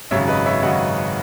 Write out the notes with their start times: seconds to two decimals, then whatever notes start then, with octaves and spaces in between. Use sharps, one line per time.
0.11 G#1 F#2 C#3 F#3 C#5 E5
0.28 B4 D#5
0.46 C#5 E5
0.63 G#1 F#2 C#3 F#3 D#5 F#5